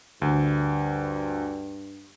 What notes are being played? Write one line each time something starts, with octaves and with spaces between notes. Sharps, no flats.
D2 G2